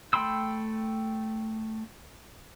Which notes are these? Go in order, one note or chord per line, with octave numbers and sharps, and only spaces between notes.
A3 G5 B5 C6 E6